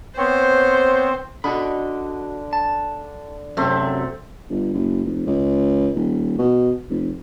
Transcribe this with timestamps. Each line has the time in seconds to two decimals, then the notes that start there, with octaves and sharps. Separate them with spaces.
0.18 B3 C4 C5 C#5
1.44 D3 F#4 D#5 B5
2.53 A5
3.57 F#2 C3 F#3 A3 C4
4.50 G1
4.73 F#1
5.05 F1
5.26 C#2
5.95 D#1
6.39 B2
6.90 F1